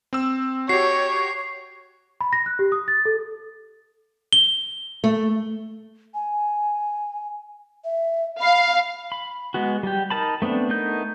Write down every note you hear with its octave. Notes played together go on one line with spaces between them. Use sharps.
C4 E6
F#4 G4 C#5 C7
B5
A#6
F#6
G4
D#6
A6
A4
G7
A3
G#5
E5
F5 B5
B5
G#3 B3 F#4
G3 G4
D#4 A#4 A5 B5
A3 B3 C4 D4
A3 B3 D#4 A#4 G6